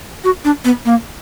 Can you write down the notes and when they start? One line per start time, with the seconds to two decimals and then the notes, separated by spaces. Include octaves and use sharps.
0.24 F#4
0.45 D4
0.65 B3
0.85 A#3